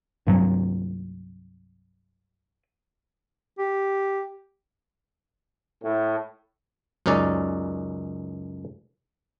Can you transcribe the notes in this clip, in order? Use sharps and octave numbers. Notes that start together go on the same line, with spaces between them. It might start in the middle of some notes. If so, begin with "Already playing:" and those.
C2 G2 F#3
G4
A2
C#2 F#2 C#4 D#4 D5